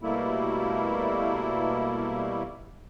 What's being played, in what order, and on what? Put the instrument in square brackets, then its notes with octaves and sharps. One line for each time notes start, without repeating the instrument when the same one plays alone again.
[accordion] B2 G3 A3 A#3 E4